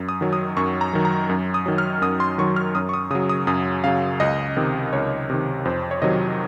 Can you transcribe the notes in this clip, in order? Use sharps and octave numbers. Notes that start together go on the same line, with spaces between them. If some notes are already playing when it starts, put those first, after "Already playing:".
Already playing: F#2
D#6
D#3 F#3
D#6
F#2 C#6
A#5
D#3 F#3
A#5
F#2
D#6
D#3 F#3
F6
F#2 D#6
C6
D#3 F#3 C#6
F6
F#2 D#6
C#6
D#6
C#3 F#3 D#6
D#6
F#2 D#6
C#3 F#3 F5
C#2 D#5
C3 D#3
C#2 C#5
C3 D#3
F2 C5
C#5
C3 D#3 F#3 D#5